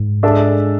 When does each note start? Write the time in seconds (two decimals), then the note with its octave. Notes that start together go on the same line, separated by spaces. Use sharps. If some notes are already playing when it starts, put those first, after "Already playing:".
Already playing: G#2
0.23 G#3 D4 A4 E5